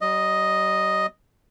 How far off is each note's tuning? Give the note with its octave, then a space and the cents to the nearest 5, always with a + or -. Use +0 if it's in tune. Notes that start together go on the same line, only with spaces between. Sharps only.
G3 -45 D#5 +0